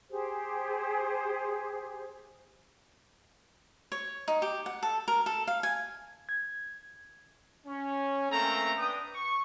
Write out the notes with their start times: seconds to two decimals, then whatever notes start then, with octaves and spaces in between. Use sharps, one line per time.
0.10 G4 G#4 C5
3.92 C#5
4.28 D#4
4.42 G4
4.66 F#5
4.83 A4
5.08 A#4
5.26 A4
5.47 F5
5.63 G#5
6.29 G#6
7.67 C#4
8.31 A3 A#3 C4 C#4 A4 A#5
8.78 D4 B4 G5 D#6
9.14 C#6